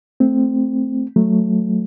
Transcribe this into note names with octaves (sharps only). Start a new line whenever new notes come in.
A3 C4
F#3 A3